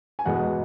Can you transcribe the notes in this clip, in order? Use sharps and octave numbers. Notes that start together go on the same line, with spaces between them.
G#5
E2 B2 G#3 B3 F#5